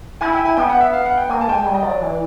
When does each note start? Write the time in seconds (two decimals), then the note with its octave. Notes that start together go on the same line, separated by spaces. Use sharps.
0.21 E4 G#5
0.34 G5
0.45 G#5
0.57 B3 G5
0.69 F#5
0.81 E5
0.93 F5
1.06 F#5
1.17 G5
1.29 A#3 G#5
1.41 A5
1.47 G#3 G5
1.52 G#5
1.64 G3 G5
1.74 D#5
1.83 F#3 D5
2.01 E3